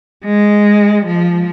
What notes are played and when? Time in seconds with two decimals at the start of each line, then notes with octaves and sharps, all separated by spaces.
0.24 G#3
1.06 F3